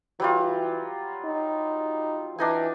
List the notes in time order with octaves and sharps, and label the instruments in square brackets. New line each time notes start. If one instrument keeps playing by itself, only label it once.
[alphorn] E3 [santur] F#3 G3 F4
[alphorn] D#4
[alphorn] E3 [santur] D4 D#4 G#5